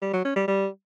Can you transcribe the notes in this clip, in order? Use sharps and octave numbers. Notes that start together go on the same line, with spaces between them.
G3
F#3
C#4
G3
G3